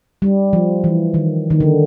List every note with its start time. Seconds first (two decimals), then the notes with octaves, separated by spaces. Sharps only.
0.22 G3
0.53 F3
0.84 E3
1.14 D#3
1.50 D#3
1.60 D3